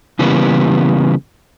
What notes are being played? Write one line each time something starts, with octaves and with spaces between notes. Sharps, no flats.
C#3 E3 G3 A#3 B3